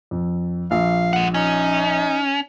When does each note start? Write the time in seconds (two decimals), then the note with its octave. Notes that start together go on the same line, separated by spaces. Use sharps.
0.11 F2
0.71 A#1 F5
1.13 G#3 F#5
1.34 C#4 D#4